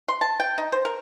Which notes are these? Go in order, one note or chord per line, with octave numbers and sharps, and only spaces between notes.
C6
A5
G5
D#4
C5
A#4